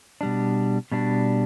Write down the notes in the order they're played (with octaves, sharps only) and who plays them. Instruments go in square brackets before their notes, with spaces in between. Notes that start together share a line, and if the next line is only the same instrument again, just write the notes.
[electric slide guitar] B2 G3 D4
B2 G3 D4